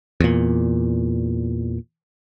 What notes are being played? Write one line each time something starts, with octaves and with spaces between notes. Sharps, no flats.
E2 A#2